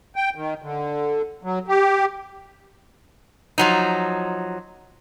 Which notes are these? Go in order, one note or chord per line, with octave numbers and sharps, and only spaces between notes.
G5
D#3
D3
F#3
G4
F3 F#3 D#4